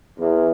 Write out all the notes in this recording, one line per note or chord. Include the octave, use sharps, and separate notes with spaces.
E2